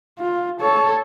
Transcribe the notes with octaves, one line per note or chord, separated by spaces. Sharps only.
F4
A4 C#5